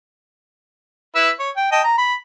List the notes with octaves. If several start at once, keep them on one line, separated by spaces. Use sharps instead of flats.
E4 B4 E6
C#5
G5
D#5 G5 A5
A#5
B5